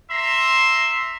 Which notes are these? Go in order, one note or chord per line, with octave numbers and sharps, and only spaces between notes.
E5 A#5 C6